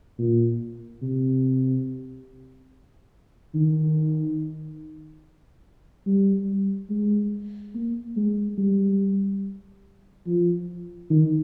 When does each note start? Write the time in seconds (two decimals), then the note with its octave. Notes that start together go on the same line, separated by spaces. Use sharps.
0.19 A#2
1.02 C3
3.55 D#3
6.06 G3
6.90 G#3
7.75 A#3
8.17 G#3
8.58 G3
10.26 F3
11.10 D#3